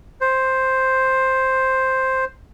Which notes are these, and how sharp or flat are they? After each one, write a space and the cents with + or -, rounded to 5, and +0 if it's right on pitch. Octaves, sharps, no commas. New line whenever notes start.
C5 +5